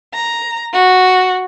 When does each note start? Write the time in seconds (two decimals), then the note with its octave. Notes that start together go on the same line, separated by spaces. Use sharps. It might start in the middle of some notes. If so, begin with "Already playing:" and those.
0.14 A#5
0.73 F#4